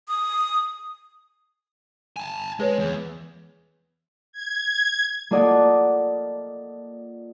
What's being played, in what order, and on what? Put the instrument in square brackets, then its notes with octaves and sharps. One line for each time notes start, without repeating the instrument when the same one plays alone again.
[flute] D#6
[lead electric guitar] G#5 A5
[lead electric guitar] G#3 [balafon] G#4 B4 C#5
[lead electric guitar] E2
[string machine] G#6
[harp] A#3 F4 A4 D5 D#5 F#5